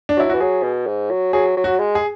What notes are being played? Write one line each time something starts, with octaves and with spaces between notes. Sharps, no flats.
D4
F#3 E4
E3 F#4
F#3 G#4
B2
G#2
F#3
F#3 G#4
F#3
F#4
G#3
G#4